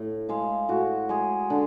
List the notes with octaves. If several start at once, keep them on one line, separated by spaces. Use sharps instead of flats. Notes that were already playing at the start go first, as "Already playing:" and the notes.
Already playing: A2
G#3 F5
A2 F#4
G#3 G#4
D3